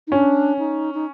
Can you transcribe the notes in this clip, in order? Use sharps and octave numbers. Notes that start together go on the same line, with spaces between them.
D#4
C#4 D4
D#4
D#4